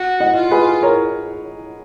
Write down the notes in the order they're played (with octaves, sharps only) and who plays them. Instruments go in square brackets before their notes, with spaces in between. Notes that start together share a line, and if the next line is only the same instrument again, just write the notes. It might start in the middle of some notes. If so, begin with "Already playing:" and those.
Already playing: [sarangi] F#4
[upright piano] D#5 F#5
[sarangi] F4
[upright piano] G#4 B4
A#4 C#5